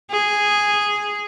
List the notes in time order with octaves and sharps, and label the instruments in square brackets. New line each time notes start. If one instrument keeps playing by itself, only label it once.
[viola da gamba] G#4